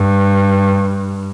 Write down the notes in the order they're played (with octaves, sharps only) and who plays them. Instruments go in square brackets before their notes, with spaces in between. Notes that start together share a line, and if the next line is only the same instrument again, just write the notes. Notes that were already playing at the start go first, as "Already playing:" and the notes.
Already playing: [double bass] G2